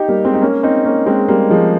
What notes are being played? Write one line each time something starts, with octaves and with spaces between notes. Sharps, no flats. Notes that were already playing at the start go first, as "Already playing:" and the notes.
Already playing: D#4 G4
G3 A#3
G#3 C4
D#4
A#3 C#4
C4 D#4
A#3 C#4
G#3 C4
G3 A#3
F3 G#3